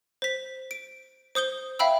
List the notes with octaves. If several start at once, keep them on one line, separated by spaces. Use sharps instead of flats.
C5 B6
D7
C5 D#6 G6 G7
E5 F5 G5 B5 E6